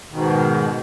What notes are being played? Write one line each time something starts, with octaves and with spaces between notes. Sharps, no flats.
G#2 B2 D#3